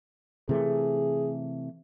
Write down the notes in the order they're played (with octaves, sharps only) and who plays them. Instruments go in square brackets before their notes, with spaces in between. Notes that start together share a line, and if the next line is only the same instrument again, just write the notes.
[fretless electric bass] C3 E3 A3 [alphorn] G#4